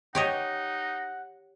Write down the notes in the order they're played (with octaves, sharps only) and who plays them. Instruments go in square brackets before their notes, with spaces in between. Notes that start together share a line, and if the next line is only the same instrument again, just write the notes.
[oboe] D#4 [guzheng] G4 C#5 D#5 [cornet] F#5